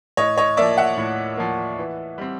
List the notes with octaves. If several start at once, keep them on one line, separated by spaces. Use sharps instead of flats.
A2 C#5 D#5
C#5 D#5
F3 A#3 D5 E5
E5 F#5
A2
F3 A#3
E3
G3 C4